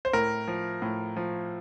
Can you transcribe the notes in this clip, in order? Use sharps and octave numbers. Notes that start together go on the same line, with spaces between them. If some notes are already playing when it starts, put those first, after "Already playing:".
C5
A2 A#4
F3
A2
F3